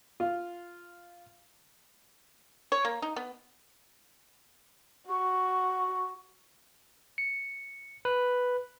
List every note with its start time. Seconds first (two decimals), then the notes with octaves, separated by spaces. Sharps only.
0.20 F4
2.72 C#5
2.85 A#3
3.02 D#4
3.16 B3
5.09 F#4 C#6
7.18 C#7
8.05 B4